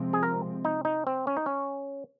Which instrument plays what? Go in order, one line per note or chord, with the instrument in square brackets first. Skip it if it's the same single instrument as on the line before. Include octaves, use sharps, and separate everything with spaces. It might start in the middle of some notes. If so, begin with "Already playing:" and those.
Already playing: [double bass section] C3 F3 G#3 C4
[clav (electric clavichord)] G#4
A#4
D#4
D#4
C4
C#4
D#4
C#4